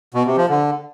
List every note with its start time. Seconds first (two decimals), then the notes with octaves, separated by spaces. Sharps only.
0.14 B2
0.26 C3
0.37 F3
0.49 D3